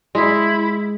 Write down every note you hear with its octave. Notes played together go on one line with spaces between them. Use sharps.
G#3 E4